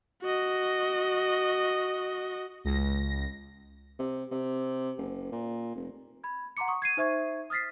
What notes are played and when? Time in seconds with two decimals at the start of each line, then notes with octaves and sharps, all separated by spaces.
0.23 F#4 D#5
2.64 C#2 A#6
3.99 C3
4.32 C3
4.98 F#1
5.32 A#2
5.76 F1
6.24 B5 G#6
6.57 F#5 A#5 C6 D6 C#7
6.68 C#6 D#6
6.82 G#6 C7 D#7
6.97 D#4 C5 E5 C#6 G#6
7.50 D#6 F6 A6 B6 C7